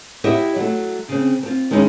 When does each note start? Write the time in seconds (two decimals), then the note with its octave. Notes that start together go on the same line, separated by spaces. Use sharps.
0.24 E4 G4 D#5 E5 F#5
0.56 F#3 A3
1.09 C#3 C4
1.43 C4 F4
1.71 D#3 G#3 C#4 D#4 E4